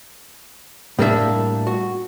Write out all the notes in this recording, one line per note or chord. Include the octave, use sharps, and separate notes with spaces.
A2 G3 A#3 D4 G#4 E5
F#4